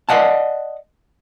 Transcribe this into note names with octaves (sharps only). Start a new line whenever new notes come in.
D5 D#5 F#5 A5